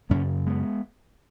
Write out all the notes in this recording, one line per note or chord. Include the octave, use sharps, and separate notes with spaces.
F#2 C#3 A#3 C#4
G#3 B3